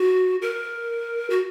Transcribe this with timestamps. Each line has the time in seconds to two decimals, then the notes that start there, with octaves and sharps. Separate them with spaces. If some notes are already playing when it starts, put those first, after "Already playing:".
Already playing: F#4
0.42 A#4
1.30 F#4